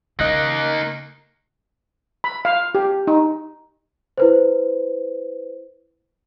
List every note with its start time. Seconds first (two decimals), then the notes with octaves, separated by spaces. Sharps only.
0.19 C#3 A#3 D#4 D#5 F#6 A#6
2.24 B5
2.45 F5
2.75 G4
3.07 D#4
4.18 E4 B4 C5